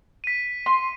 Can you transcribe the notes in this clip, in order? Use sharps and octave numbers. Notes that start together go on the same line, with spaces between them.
B6 D#7
C6